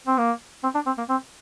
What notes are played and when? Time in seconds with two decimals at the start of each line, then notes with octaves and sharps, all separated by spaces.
0.07 C4
0.18 A#3
0.63 C4
0.75 D4
0.86 C4
0.98 A#3
1.09 C4